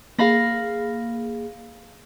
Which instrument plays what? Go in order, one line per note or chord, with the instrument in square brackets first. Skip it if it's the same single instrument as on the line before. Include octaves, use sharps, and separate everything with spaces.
[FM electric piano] A#3 G#4 [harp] F5 B5 A#6